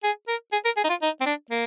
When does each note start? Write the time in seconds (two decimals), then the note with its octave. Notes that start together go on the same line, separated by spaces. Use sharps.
0.04 G#4
0.28 A#4
0.53 G#4
0.65 A#4
0.77 G#4
0.84 D#4
0.90 F4
1.02 D#4
1.21 C4
1.26 D4
1.51 A#3